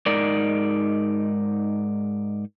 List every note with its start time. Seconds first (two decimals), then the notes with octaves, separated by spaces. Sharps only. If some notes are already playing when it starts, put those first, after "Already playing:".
0.06 G#2 D#4 A#4 D5